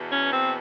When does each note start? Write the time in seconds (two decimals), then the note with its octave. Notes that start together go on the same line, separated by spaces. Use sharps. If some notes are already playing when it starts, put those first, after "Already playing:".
Already playing: E2 B2
0.10 C#4
0.32 C4